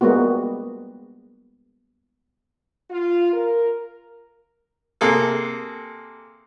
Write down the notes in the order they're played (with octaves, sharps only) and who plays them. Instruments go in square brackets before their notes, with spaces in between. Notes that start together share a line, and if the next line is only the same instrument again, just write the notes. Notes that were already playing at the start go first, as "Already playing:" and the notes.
[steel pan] G3 G#3 A#3 B3 F#4
[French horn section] F4
A#4
[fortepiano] C3 A#3 G#4 A4